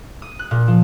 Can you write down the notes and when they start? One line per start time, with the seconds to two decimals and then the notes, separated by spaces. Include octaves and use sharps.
0.22 D#6
0.39 F#6
0.51 A#2
0.68 F3